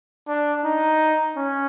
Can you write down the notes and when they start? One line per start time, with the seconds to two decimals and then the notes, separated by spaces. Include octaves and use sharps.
0.28 D4
0.64 D#4
1.37 C#4